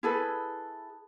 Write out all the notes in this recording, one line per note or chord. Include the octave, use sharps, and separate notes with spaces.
E4 G#4 A4 B4